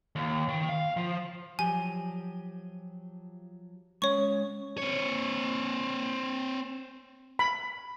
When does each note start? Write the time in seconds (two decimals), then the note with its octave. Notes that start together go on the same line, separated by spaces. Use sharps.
0.15 D#2
0.48 D#3
0.69 F5
0.97 F3
1.59 F3 F#3 G4 G#5
4.02 G#3 C#4 C#5 C#6
4.78 C4 C#5
7.39 B5